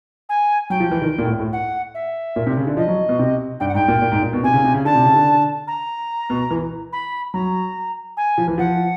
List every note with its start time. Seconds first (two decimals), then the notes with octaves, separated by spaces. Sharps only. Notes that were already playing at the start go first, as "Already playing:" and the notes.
0.29 G#5
0.70 F#3 G5
0.80 F3
0.91 E3
1.02 D#3
1.18 A#2
1.25 A2
1.39 A2
1.52 F#5
1.94 E5
2.36 A#2
2.47 C3
2.57 C#3
2.67 D3
2.77 F3 D#5
2.88 F#3
3.09 B2
3.19 C3
3.60 G2 G5
3.68 F#5
3.74 G#2 G5
3.88 A#2
4.02 A#2
4.12 G#2
4.22 A#2
4.33 B2
4.43 C3 G#5
4.53 C#3
4.64 C3
4.74 C#3
4.85 D3 A5
4.95 C3
5.05 C#3
5.16 D3
5.67 A#5
6.30 B2
6.50 E3
6.92 B5
7.33 F#3 A#5
8.17 G#5
8.38 F3
8.48 E3
8.58 F3 F#5